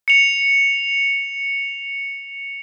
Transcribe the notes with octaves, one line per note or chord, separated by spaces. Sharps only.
C#7 F7